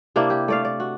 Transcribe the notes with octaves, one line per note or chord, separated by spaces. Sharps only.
C3 A#3 D4 E4
G4
A3 D5 F5
D5
F#4